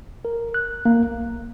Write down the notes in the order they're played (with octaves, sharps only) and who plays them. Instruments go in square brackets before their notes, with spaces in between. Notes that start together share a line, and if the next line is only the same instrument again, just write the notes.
[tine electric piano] A#4
F#6
A#3
B1